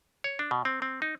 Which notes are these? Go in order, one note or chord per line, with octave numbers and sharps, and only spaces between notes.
C#5
D4
B2
C4
C4
D#4